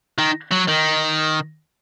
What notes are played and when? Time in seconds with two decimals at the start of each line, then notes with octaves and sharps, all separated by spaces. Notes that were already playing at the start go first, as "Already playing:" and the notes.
0.18 D#3
0.52 F#3
0.68 D#3